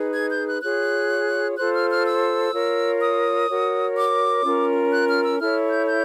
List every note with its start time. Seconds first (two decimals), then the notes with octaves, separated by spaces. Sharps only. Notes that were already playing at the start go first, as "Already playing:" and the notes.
Already playing: D#4 G#4 B4
0.14 G#6
0.31 G6
0.47 F#6
0.62 F4 G#4 C#5 F#6
1.57 F4 A4 C5 F#6
1.73 F6
1.90 F6
2.06 E6
2.53 F4 A#4 C#5
3.01 D#6
3.49 F#4 A#4 C#5
3.97 D6
4.44 C#4 F4 A#4
4.92 F#6
5.08 F6
5.24 E6
5.39 E4 A4 C#5 F6
5.71 G6
5.87 G6